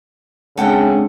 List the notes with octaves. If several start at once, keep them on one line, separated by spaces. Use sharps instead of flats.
C#3 G#3 C4 D4 A4 F#5 G5